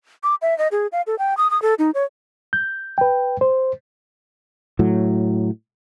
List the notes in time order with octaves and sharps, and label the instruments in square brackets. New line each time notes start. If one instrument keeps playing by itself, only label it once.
[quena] D6
E5
D#5
G#4
F5
A4
G5
D#6
D#6
A4
D#4
C#5
[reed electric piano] G6
B4 G5
C5
[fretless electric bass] A2 F#3